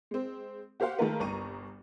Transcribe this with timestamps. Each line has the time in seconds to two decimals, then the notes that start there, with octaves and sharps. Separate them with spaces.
0.11 G#3 C4
0.80 F#4 G4 C5 F5 F#5
0.99 D#3 G#3 A3 F4 A#4 B4
1.20 G1 C2 A#5 C#6 D#7